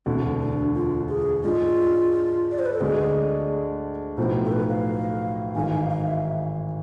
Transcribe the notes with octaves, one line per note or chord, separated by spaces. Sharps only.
E1 D2 D3 C4
D4
F4
G#4
G#2 G#3 D4 F4
D5
C5
B4
A4
D2 D3 G#3 D4 G#4
B1 A2 F3 B3 C5
A4
B4
F5
G#1 G#2 E3 G#5
F5
F5
E5